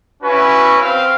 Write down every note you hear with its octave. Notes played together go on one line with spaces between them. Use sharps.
C#4 E4 F#4 B4
C4 F5